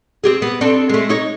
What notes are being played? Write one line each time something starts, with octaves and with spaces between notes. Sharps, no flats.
C4 G4 G#4
B3
C4 D4 A4
G#3 A3
D#4 C#5